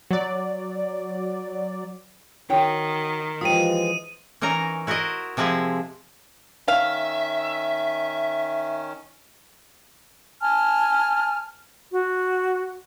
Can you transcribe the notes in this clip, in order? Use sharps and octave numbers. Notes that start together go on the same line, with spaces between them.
F#3 D5
D#3 F#4 C#5 G5
E3 F3 G#3 F4 G4 D#5 D#6 D#7
E3 C#4 D#4 A#4 A#5
E4 F#4 A#4 C5 D#5
C3 F3 G#3 E4 G#4
D#3 C#4 E5 F5
G#5 A5 F6
F#4